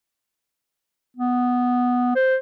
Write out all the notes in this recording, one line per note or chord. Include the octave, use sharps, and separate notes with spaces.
B3
C5